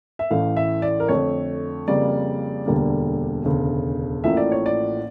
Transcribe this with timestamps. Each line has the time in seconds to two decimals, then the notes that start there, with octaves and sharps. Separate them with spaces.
0.19 E5
0.31 A1 A2 E3 A3 F5
0.57 E5
0.82 D5
1.00 A#4
1.08 F2 D3 A3 C#5
1.88 F2 C#3 G3 A#3 D5
2.66 E1 D2 D3 G3 A#3
3.45 E1 D2 C#3
4.23 A1 A2 F3 A#3 E5
4.37 D5
4.52 C#5
4.66 D5